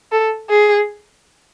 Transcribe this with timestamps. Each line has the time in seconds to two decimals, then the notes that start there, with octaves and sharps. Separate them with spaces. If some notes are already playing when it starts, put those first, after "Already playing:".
0.12 A4
0.50 G#4